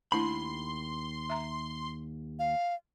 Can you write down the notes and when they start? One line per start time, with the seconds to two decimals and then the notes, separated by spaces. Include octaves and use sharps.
0.12 D#2 A3 D4 E4 B5 C6
1.30 E5 A#5
2.39 F5